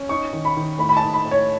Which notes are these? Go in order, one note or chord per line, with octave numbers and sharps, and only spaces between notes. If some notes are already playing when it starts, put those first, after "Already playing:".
Already playing: C#4
D#4 C#6
D#3
B5
D#3
A2 B5
B5
D#4 A5
B5
A2
C#5